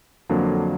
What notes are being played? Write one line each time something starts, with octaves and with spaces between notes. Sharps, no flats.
F2 D3 F#3 A#3 D4